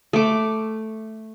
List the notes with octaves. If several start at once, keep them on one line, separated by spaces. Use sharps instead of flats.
A3 D6